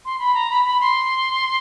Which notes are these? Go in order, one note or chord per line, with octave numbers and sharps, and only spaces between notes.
C6
B5
A#5
B5
B5
C6